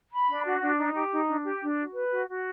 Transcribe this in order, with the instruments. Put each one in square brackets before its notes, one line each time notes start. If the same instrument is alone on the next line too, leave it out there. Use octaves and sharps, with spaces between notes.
[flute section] B5
D4
F#4
D4
D#4
G4
D#4
D4
G4
D4
F#4
B4
F#4
F#4